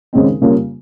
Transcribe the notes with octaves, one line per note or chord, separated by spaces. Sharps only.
D#2 C#3 G#3 C4 D#4
C#3 G3 A#3 F4